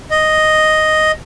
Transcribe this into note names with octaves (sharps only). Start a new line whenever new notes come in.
D#5